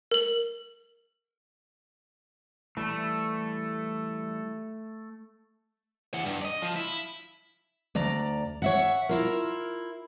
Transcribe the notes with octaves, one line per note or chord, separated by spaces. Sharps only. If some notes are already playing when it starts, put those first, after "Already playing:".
A#4 F#7
E3 G3 A3 A4
E3 F#5
G2
D5 D#5
F3
E4
D2 D5 A#5
C#5 E5 F#5
E4 F4 A#4